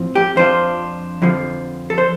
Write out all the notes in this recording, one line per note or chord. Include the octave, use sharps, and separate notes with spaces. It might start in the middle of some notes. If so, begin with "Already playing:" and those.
Already playing: A2 F3 C4 F4
G4
F2 F3 D4 F4 C5
F2 D3 F3
A4
C5